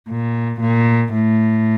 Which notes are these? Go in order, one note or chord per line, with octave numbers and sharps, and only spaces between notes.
A#2
A#2
A2